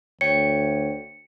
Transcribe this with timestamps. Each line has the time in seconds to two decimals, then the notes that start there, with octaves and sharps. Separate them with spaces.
0.21 D2 C#5 G5 C#7